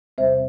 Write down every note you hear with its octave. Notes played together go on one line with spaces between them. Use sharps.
E2 C3 G3 C4 C5 E5